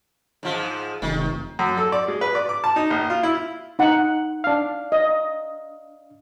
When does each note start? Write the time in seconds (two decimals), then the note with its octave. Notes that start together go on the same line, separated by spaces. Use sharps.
0.43 G#2 F3
1.02 F1 D#3
1.59 F#2
1.77 A4
1.92 D5
2.08 G#3
2.21 B4
2.35 D5
2.49 D6
2.64 A5
2.76 D#4
2.90 A#1
3.10 F4
3.23 E4
3.79 D#4 F#5
4.44 D4 F5
4.92 D#5